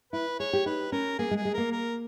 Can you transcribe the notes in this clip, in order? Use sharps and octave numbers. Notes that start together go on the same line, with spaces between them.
E4 B4
G#4 C#5
G4
D#4 B4
C#4 A#4
A#3 G#4
G#3
G#4
G#3
A#3 A#4
A#4